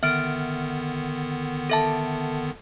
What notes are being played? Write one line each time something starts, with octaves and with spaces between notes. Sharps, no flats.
D3 D#3 B3 E5 F6 D7
A4 E5 A5